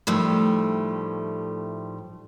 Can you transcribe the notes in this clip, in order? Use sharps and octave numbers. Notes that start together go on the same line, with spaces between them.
A2 D#3 F3 G3 A3